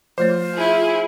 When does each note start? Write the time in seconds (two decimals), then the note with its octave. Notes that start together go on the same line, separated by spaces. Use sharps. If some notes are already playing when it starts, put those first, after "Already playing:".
0.18 F3 A3 F4 C5 C#5
0.54 E4 G#4